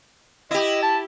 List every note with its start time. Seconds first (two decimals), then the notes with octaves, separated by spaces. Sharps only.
0.51 E4 G4 D#5
0.83 A5